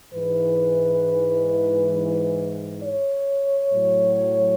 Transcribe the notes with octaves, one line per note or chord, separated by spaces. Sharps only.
G#2 E3 B4
C#5
A2 F#3